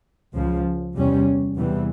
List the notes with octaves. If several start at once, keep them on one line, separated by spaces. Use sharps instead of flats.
C#2 C#3 F3
E2 C3 G3 C#4
E2 C3 E3 G3